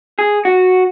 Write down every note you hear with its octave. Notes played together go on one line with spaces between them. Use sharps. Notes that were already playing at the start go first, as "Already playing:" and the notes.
G#4
F#4